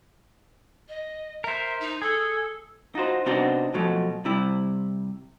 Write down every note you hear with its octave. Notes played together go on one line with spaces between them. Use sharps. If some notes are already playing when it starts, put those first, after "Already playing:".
D#5
A#4 C5 E5
D#4
G#4 A4
D#4 F4 F#4 C5
C3 B3 C4 D4 D#4 F#4
B2 F3 F#3 A3
C3 G3 E4